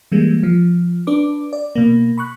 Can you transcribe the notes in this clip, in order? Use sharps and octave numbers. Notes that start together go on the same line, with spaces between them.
E3 G3 G#3 A#3
F3
D4 B4 D6
D5
B2 A#3
B5 C#6 F#6